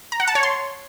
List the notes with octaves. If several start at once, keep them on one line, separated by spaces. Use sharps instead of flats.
A#5
F#5
A5
C#5
C6